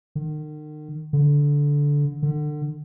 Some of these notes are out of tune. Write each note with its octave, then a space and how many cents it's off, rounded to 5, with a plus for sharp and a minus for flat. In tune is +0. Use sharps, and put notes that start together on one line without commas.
D#3 -40
D3 -15
D3 +30